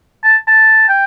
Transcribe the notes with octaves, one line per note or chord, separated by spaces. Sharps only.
A5
A5
G5